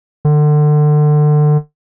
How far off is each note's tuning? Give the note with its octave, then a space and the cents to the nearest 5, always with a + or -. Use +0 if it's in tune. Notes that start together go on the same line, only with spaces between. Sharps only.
D3 +30